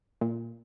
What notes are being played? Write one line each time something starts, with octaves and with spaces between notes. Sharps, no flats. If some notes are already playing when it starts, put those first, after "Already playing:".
A#2